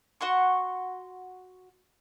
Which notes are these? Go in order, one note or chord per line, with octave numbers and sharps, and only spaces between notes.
F#4 F#5 C6 C#6